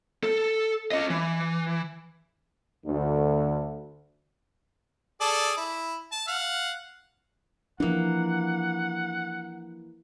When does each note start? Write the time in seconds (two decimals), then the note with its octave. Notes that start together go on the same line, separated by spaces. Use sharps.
0.23 A4
0.92 C#4 D#5
1.10 E3
2.86 D2 D3
5.21 G#4 A4 D5
5.57 E4
6.12 A5
6.28 F5 F#5
7.80 E3 F3 A#3 D4 F#5